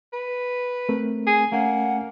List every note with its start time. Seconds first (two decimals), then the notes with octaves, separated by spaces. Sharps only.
0.13 B4
0.89 A3 C4 A#4
1.27 G#4
1.52 A3 A#3 C#4 F#5 G#5